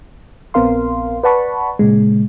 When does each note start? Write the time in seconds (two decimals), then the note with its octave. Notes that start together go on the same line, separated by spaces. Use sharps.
0.54 A#1 B3 C4 A#4 F5 C6
1.23 B4 D5 F#5 A5 B5 C#6
1.79 A#2 C#3 G#3